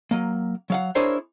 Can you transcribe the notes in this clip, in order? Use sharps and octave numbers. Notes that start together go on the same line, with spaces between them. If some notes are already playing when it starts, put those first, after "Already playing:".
F#3 A#3
F#3 F5 F#5
D4 E4 G#4 A#4 C5 C#5